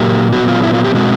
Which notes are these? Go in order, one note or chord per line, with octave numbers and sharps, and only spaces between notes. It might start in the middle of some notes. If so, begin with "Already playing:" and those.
Already playing: A#2 F#3 A#3 G4
A#2 F#3 B3 F#4
F4
E4
F4
G4
B2 G#3 C4 F#4